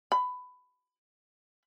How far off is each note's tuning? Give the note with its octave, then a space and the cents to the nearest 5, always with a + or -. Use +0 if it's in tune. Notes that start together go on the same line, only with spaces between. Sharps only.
B5 +15